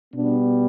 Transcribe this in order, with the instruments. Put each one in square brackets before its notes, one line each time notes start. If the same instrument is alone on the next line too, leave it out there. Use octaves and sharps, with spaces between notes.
[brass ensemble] B2 G3 B3 D4